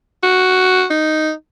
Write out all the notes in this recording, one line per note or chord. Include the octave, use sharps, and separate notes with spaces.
F#4
D#4